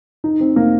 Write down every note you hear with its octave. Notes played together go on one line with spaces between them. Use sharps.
D#4
C4
A#3